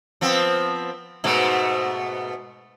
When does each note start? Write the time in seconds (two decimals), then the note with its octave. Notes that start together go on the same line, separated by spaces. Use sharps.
0.21 F3 B3 C4
1.24 G#2 B2 A3